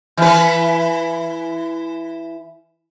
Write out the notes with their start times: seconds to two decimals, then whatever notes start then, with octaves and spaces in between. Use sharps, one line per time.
0.17 E3 B4